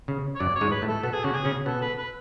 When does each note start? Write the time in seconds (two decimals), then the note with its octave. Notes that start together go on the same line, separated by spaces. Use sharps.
0.08 C#3
0.35 C#5
0.40 F#2 F#3 D5
0.56 C#5
0.61 G#2 G#3
0.72 B4
0.82 A2 A3
0.88 A4
1.03 B2 B3 A4
1.13 G#4
1.24 C#3 C#4 F#4
1.34 G#4
1.45 C#3 C#4
1.66 B2 B3 A4
1.81 B4
1.98 B4